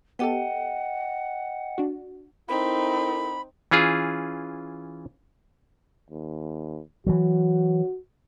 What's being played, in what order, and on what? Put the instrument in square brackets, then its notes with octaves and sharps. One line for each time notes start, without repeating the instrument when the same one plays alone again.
[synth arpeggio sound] B3 G4 A4 [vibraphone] D#5 G5 [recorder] F#5
[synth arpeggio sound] D4 F#4
[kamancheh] C4 D#4 [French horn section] E4 A4 A#4 [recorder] B5
[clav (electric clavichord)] E3 C#4 F4 G#4
[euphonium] D#2
[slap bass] E3 F#3 [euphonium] F#4